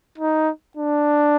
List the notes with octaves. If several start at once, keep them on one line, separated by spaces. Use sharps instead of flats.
D#4
D4